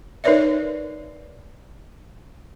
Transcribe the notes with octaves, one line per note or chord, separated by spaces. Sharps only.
D#4 A#4 B4 C#5 D5 E5